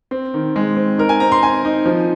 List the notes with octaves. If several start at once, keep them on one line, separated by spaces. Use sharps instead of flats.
C4
D#3
G#3
C4
D#4 A#4
G#5
C4 A#5
C6
C4 G#5
D#4
F3